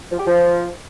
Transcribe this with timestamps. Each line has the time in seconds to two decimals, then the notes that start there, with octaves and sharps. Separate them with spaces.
0.12 F3
0.19 G4
0.27 F3